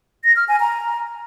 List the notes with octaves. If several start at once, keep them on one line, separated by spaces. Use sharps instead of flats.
A#6
F6
G#5
A#5